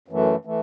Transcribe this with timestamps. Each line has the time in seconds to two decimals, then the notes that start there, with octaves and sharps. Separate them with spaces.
0.08 F#2 E3 A3
0.45 E3 A3